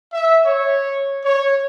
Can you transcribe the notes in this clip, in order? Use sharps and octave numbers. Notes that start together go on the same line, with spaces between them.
E5
C#5
C#5